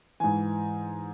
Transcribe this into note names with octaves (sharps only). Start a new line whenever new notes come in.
G#2 E3 G#5